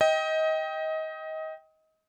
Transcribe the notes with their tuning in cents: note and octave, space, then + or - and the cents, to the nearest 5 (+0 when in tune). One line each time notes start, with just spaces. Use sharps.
D#5 +25 G5 +0